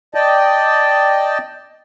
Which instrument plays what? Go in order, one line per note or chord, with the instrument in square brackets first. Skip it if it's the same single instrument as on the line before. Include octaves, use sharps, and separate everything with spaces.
[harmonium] D5 D#5 G5 A5